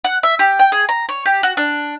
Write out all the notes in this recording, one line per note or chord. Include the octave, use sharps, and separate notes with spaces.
F#5
E5
G4
G5
G#4
A#5
C#5
G4
F#4
D4